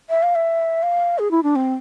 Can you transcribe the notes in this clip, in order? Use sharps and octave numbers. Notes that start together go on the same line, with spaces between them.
E5
F5
E5
F5
G#4
E4
D4
C4